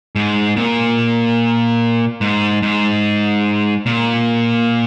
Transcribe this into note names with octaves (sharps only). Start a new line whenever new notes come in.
G#2
A#2
G#2
G#2
A#2